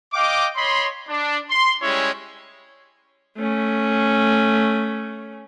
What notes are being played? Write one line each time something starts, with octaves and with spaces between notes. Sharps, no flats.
D#5 F5 G5 D6
C#5 D#5 B5 C6
D4
C6
G3 G#3 C#4 E4 C#5
A3 C#4